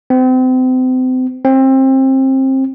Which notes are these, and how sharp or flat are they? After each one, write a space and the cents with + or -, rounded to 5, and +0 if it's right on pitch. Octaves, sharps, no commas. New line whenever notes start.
C4 -35
C4 +25